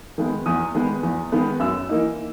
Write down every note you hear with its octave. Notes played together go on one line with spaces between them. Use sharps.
D#3 G#3 B3
E2 D#6
D#3 G#3 B3
E2
D#3 G#3 B3
F#2 E6
E3 A#3 D#4